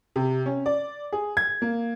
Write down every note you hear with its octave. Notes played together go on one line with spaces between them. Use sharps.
C3
C#4
D5
G#4
G#6
A#3